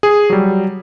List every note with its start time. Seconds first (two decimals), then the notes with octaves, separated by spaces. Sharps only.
0.03 G#4
0.30 F#3 G3